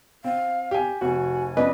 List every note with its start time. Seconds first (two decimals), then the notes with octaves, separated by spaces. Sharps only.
0.24 C4 F5
0.71 G4 G#5
1.01 F1 F#4 G#5
1.57 F2 C#4 B4 D5 D#5